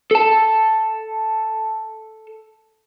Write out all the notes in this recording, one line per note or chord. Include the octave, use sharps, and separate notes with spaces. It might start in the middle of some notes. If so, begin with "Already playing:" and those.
A4 A5